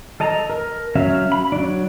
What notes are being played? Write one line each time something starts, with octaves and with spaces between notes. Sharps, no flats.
A4 D#5 A5 A#5
A#4
F#3 C#4 E5 F5
B5
F#3 D4